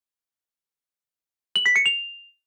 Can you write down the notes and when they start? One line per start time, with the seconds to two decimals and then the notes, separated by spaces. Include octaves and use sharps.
1.56 F#7
1.66 B6
1.76 C#7
1.86 F7